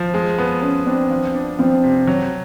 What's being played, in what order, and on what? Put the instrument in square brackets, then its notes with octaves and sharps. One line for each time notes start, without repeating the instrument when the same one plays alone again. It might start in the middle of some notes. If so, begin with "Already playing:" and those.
Already playing: [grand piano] F3
G#3
B3
[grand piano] B3 [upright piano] C#4
[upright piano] C4 [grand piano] D4
[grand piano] F3
D4
[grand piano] F3 [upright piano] C4
[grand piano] C3
F#3